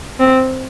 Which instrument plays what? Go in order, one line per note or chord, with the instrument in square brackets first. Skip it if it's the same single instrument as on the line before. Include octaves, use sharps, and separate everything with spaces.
[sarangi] C4